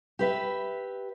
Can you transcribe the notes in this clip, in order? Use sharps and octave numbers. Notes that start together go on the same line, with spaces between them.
G4 B4 E5